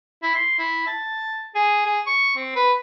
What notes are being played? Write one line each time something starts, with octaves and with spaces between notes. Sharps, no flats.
E4
C6
E4
A5
G#4
G#4
C#6
C4
B4